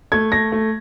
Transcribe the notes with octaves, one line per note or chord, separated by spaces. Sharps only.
A3 G#6
A3 A#6
A3